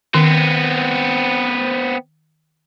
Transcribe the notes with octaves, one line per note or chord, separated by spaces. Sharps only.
D#3 B3 C4